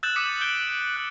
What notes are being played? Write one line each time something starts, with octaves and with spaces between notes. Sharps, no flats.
E6 F#6 G6 A6 E7 F#7
D6 D#6 B6 C#7 D#7 E7
F#6 G6 D7 G7
F#6